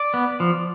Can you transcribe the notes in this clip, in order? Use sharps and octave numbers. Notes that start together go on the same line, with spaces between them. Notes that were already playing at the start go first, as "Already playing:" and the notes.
Already playing: D5
B3
F3